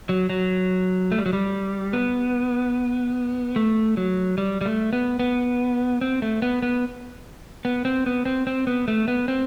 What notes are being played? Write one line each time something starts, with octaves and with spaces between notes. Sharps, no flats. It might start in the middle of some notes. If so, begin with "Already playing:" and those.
F#3
F#3
A3
G3
F#3
G3
B3
A3
F#3
G3
G3
A3
B3
B3
C4
A3
B3
B3
B3
C4
B3
C4
C4
B3
A3
B3
C4